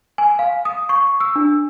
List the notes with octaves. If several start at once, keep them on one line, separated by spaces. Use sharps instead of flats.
G#5
F5
D#6
C#6
E6
D4